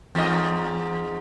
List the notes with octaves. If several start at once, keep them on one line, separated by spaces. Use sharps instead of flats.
E2 G#2 D#5